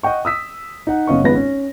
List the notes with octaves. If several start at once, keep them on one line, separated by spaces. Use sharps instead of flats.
D#5 F#5 G5 C#6
D#6 E6 B6
D#4 F#5
F#1 B3 C#4 D#5 F5 C#6
G#1 G#3 B3 F4 B4 A#6
C#4